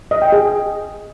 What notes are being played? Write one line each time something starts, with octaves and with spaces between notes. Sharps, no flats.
D#5
G5
G#4